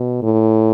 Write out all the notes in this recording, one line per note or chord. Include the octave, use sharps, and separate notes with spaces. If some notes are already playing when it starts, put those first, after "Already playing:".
Already playing: B2
A2